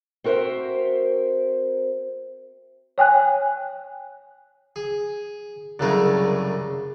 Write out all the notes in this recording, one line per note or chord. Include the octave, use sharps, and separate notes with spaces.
C4 F#4 A#4 C5 E5
C#5 G5 G#5 F#6
G#4
C2 F#2 C#3 A3 G#4 A#4